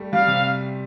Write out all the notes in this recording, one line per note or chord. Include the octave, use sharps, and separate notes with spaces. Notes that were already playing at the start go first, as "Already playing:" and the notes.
Already playing: G3 A3
G3 F5
C3